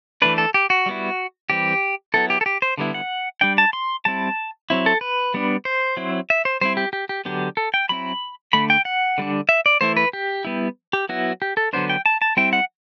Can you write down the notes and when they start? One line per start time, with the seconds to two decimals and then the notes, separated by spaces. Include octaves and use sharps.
0.22 E3 A3 D4 B4
0.38 A4
0.54 G4
0.70 F#4
0.86 G3 B3 E4
1.50 E3 G3 C4 G4
2.14 F#3 B3 E4 A4
2.30 G4
2.41 A4
2.46 G4
2.62 C5
2.78 D3 G3 B3 E4
2.94 F#5
3.41 G3 D4 G5
3.58 A5
3.73 C6
4.05 G3 C4 E4 A5
4.70 F#3 C4 E4
4.86 A4
5.01 B4
5.34 G3 B3 D4
5.65 C5
5.97 F#3 C4 E4
6.30 E5
6.45 C5
6.61 G3 C4 E4 C5
6.77 G4
6.93 G4
7.09 G4
7.25 D3 F#3 B3 D4 G4
7.57 A4
7.74 G5
7.89 F#3 C4 E4 B5
8.53 D3 A3 D4 B5
8.70 G5
8.85 F#5
9.18 D3 G3 D4
9.49 E5
9.66 D5
9.81 E3 A3 E4 C5
9.97 B4
10.13 G4
10.45 G3 B3 E4
10.93 G4
11.09 F#3 B3 E4 F#4
11.42 G4
11.57 A4
11.73 D3 F#3 B3 D4 C5
11.90 G5
12.06 A5
12.22 A5
12.37 G3 C4 E4 G5
12.53 F#5